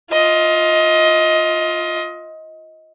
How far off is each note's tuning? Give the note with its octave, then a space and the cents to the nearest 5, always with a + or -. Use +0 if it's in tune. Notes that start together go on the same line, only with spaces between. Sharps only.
F4 +10 D#5 +20